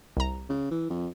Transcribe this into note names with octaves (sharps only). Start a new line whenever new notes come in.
C2 A#5
C#3
E3
F2